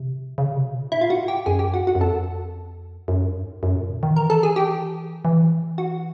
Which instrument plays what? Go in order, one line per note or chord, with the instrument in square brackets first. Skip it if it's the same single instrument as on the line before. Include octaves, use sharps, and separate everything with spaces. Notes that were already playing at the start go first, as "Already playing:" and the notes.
Already playing: [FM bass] C3
C#3
C3
B2
A#2
[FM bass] G#2 [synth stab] E4
[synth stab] F4
F#4
G4
[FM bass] F#2 [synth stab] G#4
[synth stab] G4
F#4
F#4
[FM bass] F#2
[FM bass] F2 [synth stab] A4
[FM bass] F#2
G2
G#2
F#2
A#2
D3
D#3
[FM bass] E3 [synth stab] A#4
[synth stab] A4
G#4
G4
[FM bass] E3
[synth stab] F#4